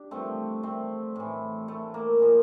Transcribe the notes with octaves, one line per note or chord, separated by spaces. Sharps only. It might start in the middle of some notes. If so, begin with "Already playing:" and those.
Already playing: D4 G4
G2 F3 A3 C4
A3 C4
A2 E3
A3
A#3
A#2 F3